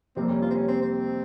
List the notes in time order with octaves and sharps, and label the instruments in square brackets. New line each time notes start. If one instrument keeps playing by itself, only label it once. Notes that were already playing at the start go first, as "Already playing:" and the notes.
[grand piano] F2 C3 G3 A#3 [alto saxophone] C4
[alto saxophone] C#4
F4
C4
C#4
C4
C4